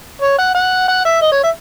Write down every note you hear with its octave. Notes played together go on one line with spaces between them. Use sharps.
C#5
F#5
F#5
F#5
E5
D#5
C#5
E5